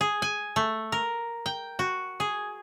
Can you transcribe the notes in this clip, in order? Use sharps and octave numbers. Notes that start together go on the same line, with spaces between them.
G#4
G#5
A3
A#4
G5
F#4
G#4